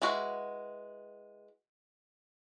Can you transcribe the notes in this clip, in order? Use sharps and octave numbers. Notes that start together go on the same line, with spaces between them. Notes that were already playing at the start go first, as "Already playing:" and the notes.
G#3 E4 F#4 B4 F5